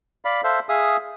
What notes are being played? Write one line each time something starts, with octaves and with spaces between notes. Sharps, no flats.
D5 F5 B5
A4 C5 E5 F5
G#4 E5 F5 D#6